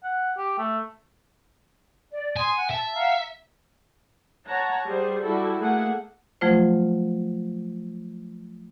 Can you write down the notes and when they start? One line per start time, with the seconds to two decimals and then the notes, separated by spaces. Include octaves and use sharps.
0.04 F#5
0.38 G4
0.58 A3
2.11 D5
2.37 G#5 C6 D#6
2.55 F#5
2.71 E5 A5
2.95 F5 F#5 A#5
4.47 C#5 F#5 A5 A#5
4.87 G3 G#4 C5
5.21 G3 E4 F#4 A4
5.59 A3 A#3 G#4 F#5
6.41 F3 F#3 A3 F4 C5